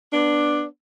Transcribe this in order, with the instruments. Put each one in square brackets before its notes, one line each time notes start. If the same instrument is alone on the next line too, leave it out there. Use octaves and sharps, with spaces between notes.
[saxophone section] B3 D4